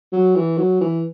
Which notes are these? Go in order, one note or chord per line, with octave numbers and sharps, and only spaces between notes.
F#3
E3
F#3
E3